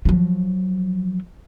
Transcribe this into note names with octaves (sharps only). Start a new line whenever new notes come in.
F3 F#3